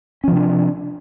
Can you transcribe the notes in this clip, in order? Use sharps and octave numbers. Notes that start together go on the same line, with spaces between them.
C3 F3 C#4 D4